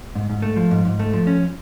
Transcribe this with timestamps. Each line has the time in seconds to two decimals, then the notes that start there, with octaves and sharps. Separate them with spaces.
0.15 G#2
0.29 G#2
0.42 A3
0.56 F3
0.71 G#2
0.85 G#2
1.00 A3
1.13 F3
1.27 C#4